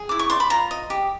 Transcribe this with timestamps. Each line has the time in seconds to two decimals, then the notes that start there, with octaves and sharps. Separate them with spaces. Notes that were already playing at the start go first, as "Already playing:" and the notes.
Already playing: G#4
0.09 E4 D6
0.19 C#6
0.30 D5 C6
0.40 B5
0.50 F4 A#5
0.71 D#5
0.90 G4